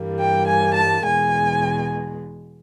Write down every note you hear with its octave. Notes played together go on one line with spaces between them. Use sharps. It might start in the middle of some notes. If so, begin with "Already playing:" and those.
Already playing: G2 E3 G3 A#3
G5
G#5
A5
E2 B2 G#3 G#5